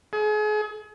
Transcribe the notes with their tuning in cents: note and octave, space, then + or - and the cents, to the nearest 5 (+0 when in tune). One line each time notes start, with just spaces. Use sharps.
G#4 +35